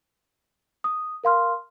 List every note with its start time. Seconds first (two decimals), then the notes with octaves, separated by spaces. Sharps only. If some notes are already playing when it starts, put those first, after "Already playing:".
0.84 D#6
1.24 A#4 F5 C6 F6